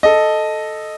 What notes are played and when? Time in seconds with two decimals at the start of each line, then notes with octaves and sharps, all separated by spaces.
0.03 A4 D#5